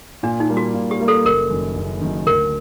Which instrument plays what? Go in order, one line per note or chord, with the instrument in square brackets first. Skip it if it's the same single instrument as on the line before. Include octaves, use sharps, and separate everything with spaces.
[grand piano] A#2 [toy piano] D4
[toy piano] D#4
[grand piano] G3 A#3
[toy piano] F#4
[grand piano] A#2
[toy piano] G4
[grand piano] G3 A#3
[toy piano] A4
[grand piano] F#1 [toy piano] A#4
[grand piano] F#2 D#3
F#1
F#2 D#3
[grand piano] D2 [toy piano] A#4